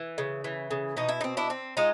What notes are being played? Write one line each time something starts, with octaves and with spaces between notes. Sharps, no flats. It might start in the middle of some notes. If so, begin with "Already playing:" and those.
Already playing: E3
C#3
E3
C#3
B2 D#4
E4
D#4
C4
D4 E4
C4
G#3 D#4 F4